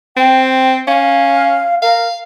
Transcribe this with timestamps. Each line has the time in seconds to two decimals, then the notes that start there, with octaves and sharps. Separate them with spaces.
0.17 C4 G5
0.87 C#4 F5
1.82 A#4 F5